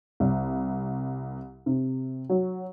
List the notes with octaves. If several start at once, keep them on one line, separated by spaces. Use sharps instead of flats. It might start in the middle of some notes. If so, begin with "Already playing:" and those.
C2
C3
F#3